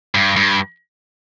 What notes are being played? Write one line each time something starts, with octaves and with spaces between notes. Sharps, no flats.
G2
G2